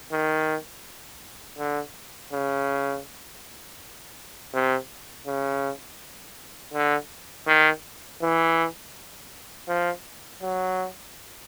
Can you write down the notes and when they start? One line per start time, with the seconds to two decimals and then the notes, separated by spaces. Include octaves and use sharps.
0.12 D#3
1.58 D3
2.33 C#3
4.54 C3
5.27 C#3
6.74 D3
7.47 D#3
8.22 E3
9.68 F3
10.42 F#3